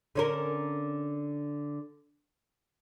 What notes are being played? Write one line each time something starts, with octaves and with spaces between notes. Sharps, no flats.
D3 C#4 A#4